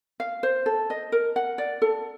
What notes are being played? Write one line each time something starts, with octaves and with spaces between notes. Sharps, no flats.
F5
C5
A4
D#5
A#4
F#5
D5
A4